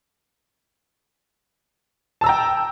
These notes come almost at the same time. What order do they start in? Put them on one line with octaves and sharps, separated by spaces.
A5 E6 A#5 G5